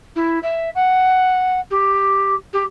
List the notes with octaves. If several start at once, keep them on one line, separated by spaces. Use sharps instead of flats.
E4
E5
F#5
G4
G4